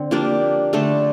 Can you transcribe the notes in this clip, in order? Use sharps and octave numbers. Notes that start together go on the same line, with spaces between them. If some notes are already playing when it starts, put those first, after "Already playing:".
Already playing: D3 C4
F3 A#3 D4 G4
D3 A3 D4 A4